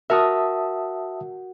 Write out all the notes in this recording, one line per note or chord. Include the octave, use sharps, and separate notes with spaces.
F#4 A#4 E5 A5 D#6